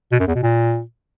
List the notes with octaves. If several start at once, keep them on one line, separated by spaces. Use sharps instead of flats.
B2
F#2
E2
B2
A#2